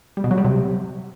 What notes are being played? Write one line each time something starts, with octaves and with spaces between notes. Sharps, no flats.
G3
B2
F#3
G3
C3